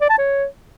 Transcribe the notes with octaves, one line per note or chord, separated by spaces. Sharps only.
D5
A5
C#5